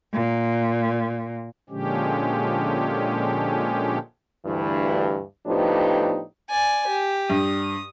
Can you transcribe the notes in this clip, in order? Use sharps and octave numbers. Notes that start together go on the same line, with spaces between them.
A#2
A#2 D3 F3 G#3 C#4 G4
D2 G2 E3
A2 F3 B3 D4 D#4 G4
D5 G#5
G4
G2 D#6